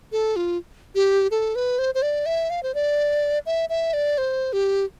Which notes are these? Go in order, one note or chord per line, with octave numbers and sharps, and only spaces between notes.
A4
F4
G4
A4
B4
C5
C5
D5
E5
F5
C5
D5
E5
E5
D5
C5
G4